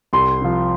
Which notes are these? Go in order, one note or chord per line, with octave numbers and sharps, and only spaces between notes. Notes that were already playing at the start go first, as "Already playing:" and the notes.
C2 C6
C3 F3